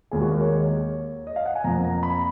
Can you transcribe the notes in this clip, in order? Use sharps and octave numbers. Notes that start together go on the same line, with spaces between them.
D#2 D#3 G#3 G#4
F#4
A#4
C#5
D#5
F5
F#5
G#5
F2 F3 A#3 A#5
A#5
B5